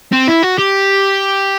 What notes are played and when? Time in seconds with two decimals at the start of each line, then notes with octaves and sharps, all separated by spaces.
0.12 C4
0.28 E4
0.43 F#4
0.58 G4